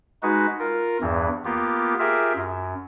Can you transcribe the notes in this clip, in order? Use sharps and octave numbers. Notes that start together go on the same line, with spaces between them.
G#3 D#4 F#4 B4
F4 A#4
E2 G2 E3
A#3 B3 F4 G4
F4 G4 G#4 A#4 E5
F#2